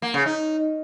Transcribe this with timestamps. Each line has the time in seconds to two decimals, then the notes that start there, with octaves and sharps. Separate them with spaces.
0.02 A#3
0.14 C#3
0.26 D#4